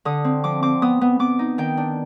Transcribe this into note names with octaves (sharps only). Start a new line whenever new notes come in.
D3 D#6
C4
F3 D6
C4 D6
B3 D#6
B3
B3 D6
D#4
D#3 G5
D4